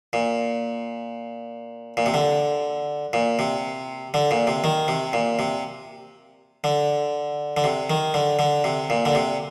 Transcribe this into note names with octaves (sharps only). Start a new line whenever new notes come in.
A#2
A#2
C3
D3
A#2
C3
D3
A#2
C3
D#3
C3
A#2
C3
D3
D3
C3
D#3
D3
D3
C3
A#2
D3
C3